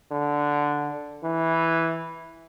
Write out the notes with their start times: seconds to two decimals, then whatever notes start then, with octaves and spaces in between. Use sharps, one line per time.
0.11 D3
1.23 E3